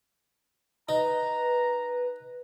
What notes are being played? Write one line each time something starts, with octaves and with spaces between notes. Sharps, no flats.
D#4 B4 A#5